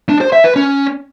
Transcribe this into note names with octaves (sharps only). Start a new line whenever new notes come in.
D4
C5
E5
B4
C#4